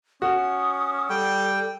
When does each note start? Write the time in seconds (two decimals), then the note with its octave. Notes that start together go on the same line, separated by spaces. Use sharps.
0.22 C#4 F#4 D#6
1.10 G3 A4 G5